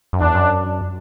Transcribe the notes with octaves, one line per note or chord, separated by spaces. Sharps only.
F#2
E2 D4
F#2